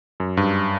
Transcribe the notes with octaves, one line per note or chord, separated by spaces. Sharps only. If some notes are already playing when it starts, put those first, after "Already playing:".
F#2
G2